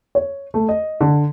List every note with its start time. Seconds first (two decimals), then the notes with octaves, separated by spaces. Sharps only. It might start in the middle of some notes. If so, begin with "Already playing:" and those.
0.15 C#5
0.54 A3
0.69 D#5
1.01 D3